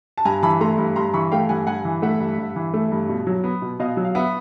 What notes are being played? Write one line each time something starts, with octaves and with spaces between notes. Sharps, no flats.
A5
G2 G#5 A#5
E3 A5 B5
A3 A#5 C6
G2
G2 A#5 C6
E3 B5 C#6
A3 F5 G5
G2 F#5 G#5
G2 F#5 G#5
E3
A3 E5 F#5
G2
G2
E3
A3
G2
B2
F#3
B3
B2
B2 D#5 F5
F#3
F5
B3 E5 F#5